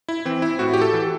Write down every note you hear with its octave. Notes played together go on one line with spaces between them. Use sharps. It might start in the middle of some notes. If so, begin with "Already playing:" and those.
E4
E3 C4
E4
A2 F#4
G4
A4
E3